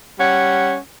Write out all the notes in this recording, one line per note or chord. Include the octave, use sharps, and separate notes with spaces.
G3 C#4 F#5